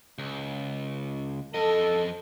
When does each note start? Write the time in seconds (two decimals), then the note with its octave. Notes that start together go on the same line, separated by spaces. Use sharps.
0.18 C#2
1.54 F2 A4 D#5